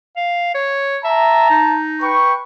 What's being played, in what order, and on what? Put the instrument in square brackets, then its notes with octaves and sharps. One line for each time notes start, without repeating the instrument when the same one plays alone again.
[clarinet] F5
C#5
[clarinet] E5 [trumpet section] A5 A#5
[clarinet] D#4
[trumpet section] B4 G5 C#6